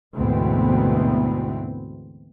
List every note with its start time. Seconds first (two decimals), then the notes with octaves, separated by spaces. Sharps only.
0.17 D2 G#2 B2 E3 B3 C4